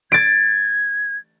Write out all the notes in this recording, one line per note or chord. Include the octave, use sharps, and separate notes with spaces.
G#6 A6 D7